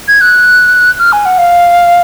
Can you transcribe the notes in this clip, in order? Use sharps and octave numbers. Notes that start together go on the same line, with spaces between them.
G#6
F#6
F6
G#5
F#5
F5